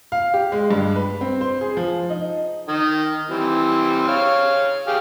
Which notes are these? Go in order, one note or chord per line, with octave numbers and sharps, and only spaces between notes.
F5
G4
G#3
G2
B4
C4
C5
G#4
F3
D#4
D#3 D#6
E3 G3 C4
C#5 F5
G4 G#4 F5